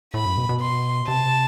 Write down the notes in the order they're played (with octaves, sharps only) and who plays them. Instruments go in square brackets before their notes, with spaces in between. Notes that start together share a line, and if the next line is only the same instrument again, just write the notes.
[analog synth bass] A2 [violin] B5
[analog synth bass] F#2
B2
B2
[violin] C6
[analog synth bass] C3 [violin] A5